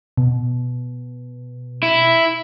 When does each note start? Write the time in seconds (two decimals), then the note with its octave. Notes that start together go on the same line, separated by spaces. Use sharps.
0.17 B2
1.83 E4